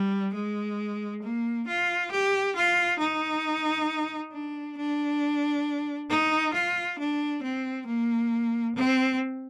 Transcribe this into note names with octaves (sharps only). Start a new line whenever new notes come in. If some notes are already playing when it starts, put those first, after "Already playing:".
Already playing: G3
G#3
A#3
F4
G4
F4
D#4
D4
D4
D#4
F4
D4
C4
A#3
C4